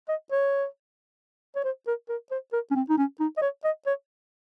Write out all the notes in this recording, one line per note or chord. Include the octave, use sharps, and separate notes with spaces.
D#5
C#5
C#5
C5
A#4
A#4
C5
A#4
C#4
C4
D#4
C#4
D#4
D#5
C#5
D#5
C#5